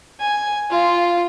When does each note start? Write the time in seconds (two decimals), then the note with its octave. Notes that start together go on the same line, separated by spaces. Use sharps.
0.20 G#5
0.70 F4